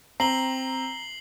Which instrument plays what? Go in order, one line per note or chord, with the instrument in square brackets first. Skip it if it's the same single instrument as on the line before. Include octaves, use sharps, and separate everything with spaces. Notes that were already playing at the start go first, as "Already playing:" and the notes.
[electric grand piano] C4 [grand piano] A#5 [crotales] C7 F#7 G7